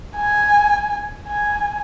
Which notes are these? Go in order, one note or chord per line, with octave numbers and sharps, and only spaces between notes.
G#5
G#5